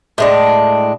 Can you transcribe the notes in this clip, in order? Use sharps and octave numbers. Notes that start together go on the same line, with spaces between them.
A2 G#3 D4